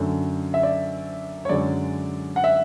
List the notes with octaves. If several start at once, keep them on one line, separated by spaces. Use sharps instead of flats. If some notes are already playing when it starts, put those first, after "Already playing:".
Already playing: F#2 D3 A3
E5
D5
C#5
F#2 D3 G#3 D5
F#5
E5